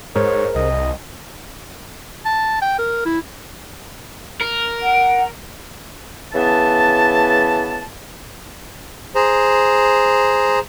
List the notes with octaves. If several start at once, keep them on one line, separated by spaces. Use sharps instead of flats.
G#2 G#4 A#4 C5 C#5
C2 D#5
A5
G5
A#4
E4
A#4
F#5
C#3 E3 B3 A5
G#4 C5 A#5